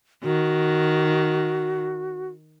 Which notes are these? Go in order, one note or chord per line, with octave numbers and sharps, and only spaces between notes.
D#3 F#4